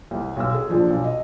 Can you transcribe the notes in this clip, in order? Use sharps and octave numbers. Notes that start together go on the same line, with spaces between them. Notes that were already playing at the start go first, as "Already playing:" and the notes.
C2
B1 E6
G#4
A#2 F3 D4
B1
D#5